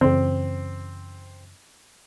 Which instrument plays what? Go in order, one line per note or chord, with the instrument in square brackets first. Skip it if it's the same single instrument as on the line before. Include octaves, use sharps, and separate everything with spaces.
[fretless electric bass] F#2 C#3 E3 [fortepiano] C4